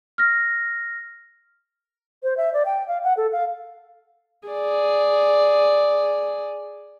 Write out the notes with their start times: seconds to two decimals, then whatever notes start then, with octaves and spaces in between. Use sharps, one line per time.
0.18 F6 A#6
2.23 C5
2.37 E5
2.54 D5
2.66 G5
2.88 F5
3.04 F#5
3.17 A4
3.32 F5
4.48 G#4 D5